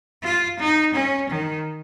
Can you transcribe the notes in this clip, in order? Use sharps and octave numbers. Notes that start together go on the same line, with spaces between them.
F4
D#4
C#4
D#3